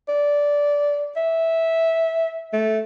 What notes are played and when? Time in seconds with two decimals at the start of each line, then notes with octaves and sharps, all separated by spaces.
0.08 D5
1.16 E5
2.53 A3